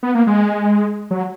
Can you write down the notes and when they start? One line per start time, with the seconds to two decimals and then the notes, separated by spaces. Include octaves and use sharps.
0.03 B3
0.15 A#3
0.27 G#3
1.11 F#3